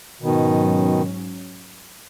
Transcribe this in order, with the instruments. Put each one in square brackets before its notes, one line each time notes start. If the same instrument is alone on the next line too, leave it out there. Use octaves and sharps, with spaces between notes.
[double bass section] G#2 F#3 C#4 [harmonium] B2 D#3